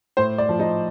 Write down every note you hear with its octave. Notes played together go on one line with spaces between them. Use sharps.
A2 C5
D5
F3
D#4